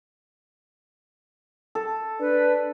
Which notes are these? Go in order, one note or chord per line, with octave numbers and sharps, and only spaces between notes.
A4
D4 B4